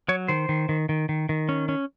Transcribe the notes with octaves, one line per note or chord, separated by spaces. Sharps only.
F#3 C#5
D#3 C5
D#3
D#3
D#3
D#3
D#3
C#4
C#4